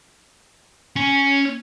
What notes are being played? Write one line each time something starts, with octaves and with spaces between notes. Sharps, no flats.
C#4